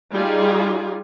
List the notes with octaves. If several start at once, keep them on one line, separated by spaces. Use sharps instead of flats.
G3 D#4 F4 G#4